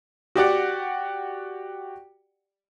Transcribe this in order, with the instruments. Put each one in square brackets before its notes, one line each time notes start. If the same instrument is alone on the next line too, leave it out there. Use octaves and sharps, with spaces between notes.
[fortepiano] F#4 G4 D5 F#5